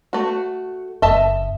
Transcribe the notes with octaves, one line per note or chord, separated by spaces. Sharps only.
A3 F#4
F#1 D#5 E5 A5